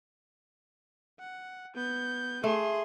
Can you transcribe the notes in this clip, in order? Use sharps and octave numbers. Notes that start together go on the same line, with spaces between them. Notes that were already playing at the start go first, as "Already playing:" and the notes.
F#5
B3 G6
A3 G#4 C6